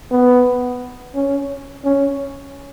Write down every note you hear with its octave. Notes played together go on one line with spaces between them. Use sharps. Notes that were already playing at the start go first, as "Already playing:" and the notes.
B3
C#4
C#4